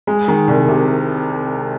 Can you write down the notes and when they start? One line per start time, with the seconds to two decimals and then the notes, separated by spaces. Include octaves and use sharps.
0.07 G#3
0.28 D#3
0.48 C2
0.68 C3